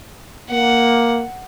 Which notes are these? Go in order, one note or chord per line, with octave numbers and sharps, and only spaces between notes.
A#3 F#5